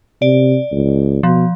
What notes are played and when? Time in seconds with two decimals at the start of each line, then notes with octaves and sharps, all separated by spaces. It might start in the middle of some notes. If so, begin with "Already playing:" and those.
0.22 C3 D5
0.72 C#2
1.23 B2 F3